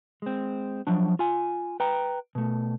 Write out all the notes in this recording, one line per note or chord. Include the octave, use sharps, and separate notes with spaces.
G#3 C4
F3 F#3 D4
F4 G#5
B4 G5 A#5
B2 A3